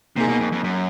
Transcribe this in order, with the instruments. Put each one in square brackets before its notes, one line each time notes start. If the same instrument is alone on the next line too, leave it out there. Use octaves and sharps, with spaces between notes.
[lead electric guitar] C3 [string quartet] A#3 D#4 G#4
[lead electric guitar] B2
F2
F2
F#2